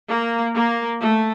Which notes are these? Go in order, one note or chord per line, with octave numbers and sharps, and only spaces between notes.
A#3
A#3
A3